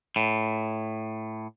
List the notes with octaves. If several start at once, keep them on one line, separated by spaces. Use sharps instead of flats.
A2